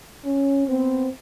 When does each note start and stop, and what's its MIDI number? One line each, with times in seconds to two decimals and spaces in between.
0.25 0.68 61
0.68 1.08 59
0.68 1.08 60